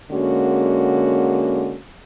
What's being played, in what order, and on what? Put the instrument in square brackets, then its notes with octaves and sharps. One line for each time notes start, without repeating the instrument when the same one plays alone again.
[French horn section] D3 G#3 A#3 C#4 F#4